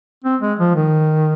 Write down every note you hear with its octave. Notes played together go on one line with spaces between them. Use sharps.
C4
G#3
F3
D#3